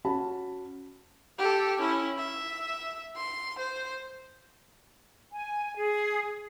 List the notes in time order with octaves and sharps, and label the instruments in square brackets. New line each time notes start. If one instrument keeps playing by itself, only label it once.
[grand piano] C#4 F#4 A5 B5
[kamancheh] G4 A4
C#4 E4
E5
C6
C5
[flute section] G#5
G#4